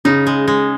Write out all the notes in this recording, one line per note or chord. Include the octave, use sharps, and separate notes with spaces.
C#3 D#4
G#3
G#3